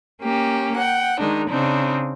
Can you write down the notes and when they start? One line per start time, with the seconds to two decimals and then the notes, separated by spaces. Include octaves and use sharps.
0.22 A#3 C#4 G4
0.76 F#5 G5
1.19 D#3 G#3 D4 D#4
1.48 C#3 C4 D4 D#4